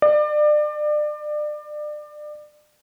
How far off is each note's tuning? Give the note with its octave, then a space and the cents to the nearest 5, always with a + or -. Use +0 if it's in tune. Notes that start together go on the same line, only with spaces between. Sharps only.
D5 +30